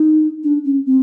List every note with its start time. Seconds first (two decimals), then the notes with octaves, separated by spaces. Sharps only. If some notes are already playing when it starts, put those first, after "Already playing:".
Already playing: D#4
0.44 D4
0.64 C#4
0.86 C4